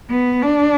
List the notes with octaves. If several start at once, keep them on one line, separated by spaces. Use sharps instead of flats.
B3
D4